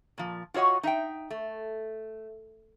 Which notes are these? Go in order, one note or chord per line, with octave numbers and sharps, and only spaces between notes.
A#2 F3
F4 F#4 C#5 D#5 F#5
D#4 E5 G5
A3